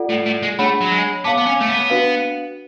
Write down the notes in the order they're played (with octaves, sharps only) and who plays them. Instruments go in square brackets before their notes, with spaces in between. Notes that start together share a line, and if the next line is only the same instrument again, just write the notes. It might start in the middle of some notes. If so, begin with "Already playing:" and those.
Already playing: [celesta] F4 A4 D5 F#5
[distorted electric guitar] A2
A2
G#3
[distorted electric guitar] A3 [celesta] D4 G#4 C#5 F#5 B5
[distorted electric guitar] F#3
G#3
[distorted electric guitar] B3 [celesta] C#5 F5 A5 D6
[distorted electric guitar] B3
C#4
A3
B3
[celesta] D4 F#4 B4 F5